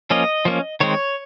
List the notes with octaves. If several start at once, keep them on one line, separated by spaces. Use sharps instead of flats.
F3 A#3 C#4 D#5
F3 A#3 C#4
D#3 G#3 C4 C#5